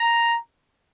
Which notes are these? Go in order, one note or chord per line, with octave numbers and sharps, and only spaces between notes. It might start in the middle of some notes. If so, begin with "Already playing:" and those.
Already playing: A#5